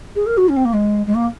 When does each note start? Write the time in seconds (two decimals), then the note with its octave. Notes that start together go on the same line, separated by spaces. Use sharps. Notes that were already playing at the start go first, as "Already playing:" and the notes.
0.15 G#4
0.26 A#4
0.37 F#4
0.48 C#4
0.56 C4
0.65 A#3
0.73 G#3
1.06 G#3
1.14 A#3